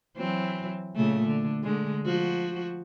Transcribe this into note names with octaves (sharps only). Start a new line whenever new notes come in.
E3 F#3 C4
A#2 C#3 A3
D3
D3 G#3
F3 F#4